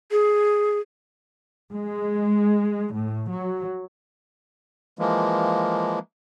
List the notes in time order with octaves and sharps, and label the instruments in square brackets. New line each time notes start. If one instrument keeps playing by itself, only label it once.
[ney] G#4
[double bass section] G#3
A2
F#3
[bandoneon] E3 F3 G#3 A#3